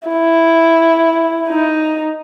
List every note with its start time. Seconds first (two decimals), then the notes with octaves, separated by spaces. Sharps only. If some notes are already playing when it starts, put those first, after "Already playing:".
0.08 E4
1.49 D#4